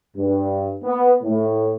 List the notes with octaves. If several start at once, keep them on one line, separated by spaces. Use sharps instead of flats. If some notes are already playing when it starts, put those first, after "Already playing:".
G2
B3
A2